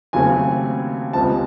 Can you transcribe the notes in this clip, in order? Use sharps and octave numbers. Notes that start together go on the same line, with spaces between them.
D#2 C#3 F#3 A3 C4 G#5
C#2 C3 F3 G#3 C4 A5